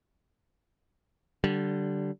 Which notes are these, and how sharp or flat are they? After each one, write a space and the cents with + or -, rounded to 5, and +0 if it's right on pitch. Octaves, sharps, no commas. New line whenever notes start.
D3 +0 G3 -25